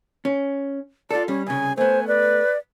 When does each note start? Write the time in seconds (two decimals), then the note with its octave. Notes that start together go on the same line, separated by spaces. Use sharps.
0.25 C#4
1.11 F4 A4 D5
1.28 G3 C#4
1.47 C2 C#3 G#5
1.78 A3 B3 C5 G#5
2.08 B4 D5